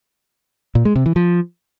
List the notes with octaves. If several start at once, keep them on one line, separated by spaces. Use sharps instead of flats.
A#2
G#3
C3
E3
F3